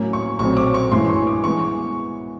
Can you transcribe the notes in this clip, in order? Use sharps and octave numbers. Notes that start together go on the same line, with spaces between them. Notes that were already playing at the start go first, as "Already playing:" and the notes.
Already playing: A2 F#3 A#3 C#4
C#6
B1 A#2 F#3 A3 C4 C#6
D6
C#6
G2 E3 G#3 C#4 E4 C6
C#6
D6
E3 G#3 B3 C#6